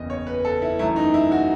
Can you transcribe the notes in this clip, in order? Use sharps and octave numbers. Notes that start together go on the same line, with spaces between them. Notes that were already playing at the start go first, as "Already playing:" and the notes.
Already playing: F#1 E2 C#3 D#5
C#5
B4
A4
E4
F#2 E3 A3 E4
D#4
E4
F#4